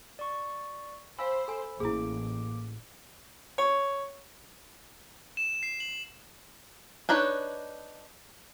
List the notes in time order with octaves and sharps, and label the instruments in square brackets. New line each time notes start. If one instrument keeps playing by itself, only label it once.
[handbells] D5 C#6
[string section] C5 [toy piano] F5 G#5 [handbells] B5 E6
[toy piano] A4 G#5
[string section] A1 [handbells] A#3 D6 [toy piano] E4 G#4
[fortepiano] C#5
[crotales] E7
C7
F#7
[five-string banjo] D4 D#4 B4 C#5